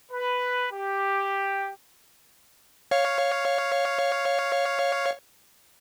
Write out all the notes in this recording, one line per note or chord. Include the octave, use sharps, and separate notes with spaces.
B4
G4
C#5 F5